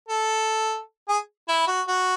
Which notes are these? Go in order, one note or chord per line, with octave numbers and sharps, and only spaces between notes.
A4
G#4
E4
F#4
F#4